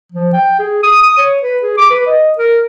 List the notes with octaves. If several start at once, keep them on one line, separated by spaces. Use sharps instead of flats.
F3
G5
G#4
D#6
D#6
C#5
B4
G#4
D6
B4
D#5
A#4